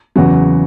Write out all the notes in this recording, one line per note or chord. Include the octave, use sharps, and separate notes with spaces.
E2 C#3 F#3 F#4